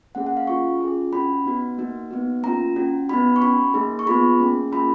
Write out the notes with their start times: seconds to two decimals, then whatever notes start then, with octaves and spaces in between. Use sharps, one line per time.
0.15 A#3 C#4 G#4 F#5
0.27 F#5
0.37 F5
0.47 C#4 F4 G#4 C#6
0.80 C#4 F4 G#4
1.13 C#4 F#4 B5
1.46 B3 D#4 F#4
1.78 A#3 D#4 F#4
2.11 B3 D#4 F#4
2.43 A#3 C#4 F4 A#5
2.76 C#4 F#4
3.09 B3 D#4 F#4 B5
3.36 C#6
3.42 C#4 F#4 B5
3.74 A#3 D#4 G#4
3.99 C#6
4.07 B3 F4 G#4 B5
4.40 A#3 C#4 G#4
4.72 A#3 C#4 F4 G#4 B5